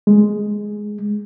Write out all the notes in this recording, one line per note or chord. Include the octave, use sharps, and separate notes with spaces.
G#3